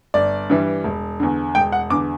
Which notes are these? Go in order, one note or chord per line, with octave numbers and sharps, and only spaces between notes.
G1 D5
G2 E3 G3
E1
E2 D3
E1 G5
F#5
E2 D3 D6